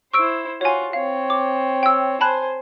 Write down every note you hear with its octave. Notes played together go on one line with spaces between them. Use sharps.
E4 C5 C#6 E6 D7
F4 F#4 C#5 G#5
C4 C#5 F5
D6
G5 E6
C5 G#5 A5 B5 F#6